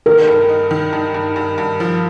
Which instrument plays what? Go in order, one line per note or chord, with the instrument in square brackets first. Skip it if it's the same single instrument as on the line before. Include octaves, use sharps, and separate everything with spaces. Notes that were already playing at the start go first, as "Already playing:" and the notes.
[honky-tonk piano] D#3 [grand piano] A#4
[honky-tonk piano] G2
D#4
D#3
G2
G2
G2
G2
F3